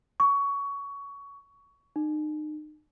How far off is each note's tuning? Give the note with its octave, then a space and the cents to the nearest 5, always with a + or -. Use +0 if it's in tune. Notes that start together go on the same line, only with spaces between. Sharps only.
C#6 +20
D#4 -35